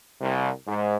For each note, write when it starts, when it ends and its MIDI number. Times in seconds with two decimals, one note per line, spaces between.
0.21 0.50 36
0.67 0.97 44